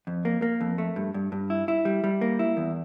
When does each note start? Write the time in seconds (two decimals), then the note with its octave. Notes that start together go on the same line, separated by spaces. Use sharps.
0.07 F2
0.25 A#3
0.42 A#3
0.61 F2
0.78 A3
0.96 G2
1.14 G2
1.32 G2
1.50 E4
1.68 E4
1.85 G3
2.04 G3
2.21 A#3
2.39 E4
2.57 E2